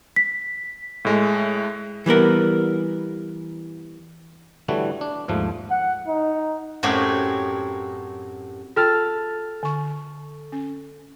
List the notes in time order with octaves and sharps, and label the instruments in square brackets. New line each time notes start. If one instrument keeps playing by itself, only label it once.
[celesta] B6
[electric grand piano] A2 G#3 A3
[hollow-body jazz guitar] E3 G3 B3 A#4
[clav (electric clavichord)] D3 E3 G3 A3 F#4 C#5
D4
D#2 G#2 F3 A3
[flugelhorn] F#5
D#4
[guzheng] F#2 A2 F#3 C4 F#4 G4
[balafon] F4 G5 [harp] A4 F6 A6
[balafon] D3 C#6
C#4